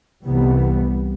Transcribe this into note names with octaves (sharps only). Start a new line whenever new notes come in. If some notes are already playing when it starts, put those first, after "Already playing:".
C2 C3 E3 G3 B3